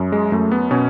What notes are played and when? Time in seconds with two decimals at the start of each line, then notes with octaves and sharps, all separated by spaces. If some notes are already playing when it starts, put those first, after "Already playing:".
Already playing: F#2
0.12 G#3
0.32 F#2 A3
0.52 B3
0.71 B2 C#4